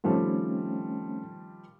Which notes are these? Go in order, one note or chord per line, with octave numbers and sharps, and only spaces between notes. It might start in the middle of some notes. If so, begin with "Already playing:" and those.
D#3 F3 G3 A3 C4 C#4